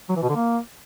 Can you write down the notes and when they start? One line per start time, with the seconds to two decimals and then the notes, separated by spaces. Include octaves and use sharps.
0.09 F#3
0.16 E3
0.23 B2
0.29 D3
0.36 A#3